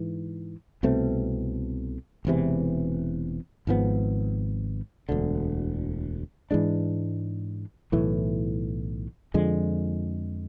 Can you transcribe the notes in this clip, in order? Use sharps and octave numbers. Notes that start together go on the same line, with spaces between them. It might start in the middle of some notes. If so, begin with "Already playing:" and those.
Already playing: G#2 E3
C2 B2 A3 C4
E1 E2 C3 E3
G#1 G#2 F3 B3
E1 D2 D3
G#2 E3 G#3 D4
B1 A2 E3 A3
F2 D3 F3 G#3